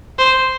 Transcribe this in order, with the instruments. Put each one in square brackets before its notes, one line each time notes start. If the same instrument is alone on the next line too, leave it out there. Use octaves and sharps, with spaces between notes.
[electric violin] C5